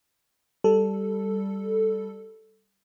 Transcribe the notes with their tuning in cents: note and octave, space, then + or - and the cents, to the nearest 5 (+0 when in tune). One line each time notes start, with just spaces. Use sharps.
G3 +0 A4 +0